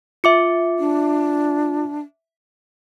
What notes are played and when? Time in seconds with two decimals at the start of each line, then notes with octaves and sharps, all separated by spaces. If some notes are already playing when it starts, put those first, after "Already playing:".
0.24 F4 E5 D6 C#7
0.79 D4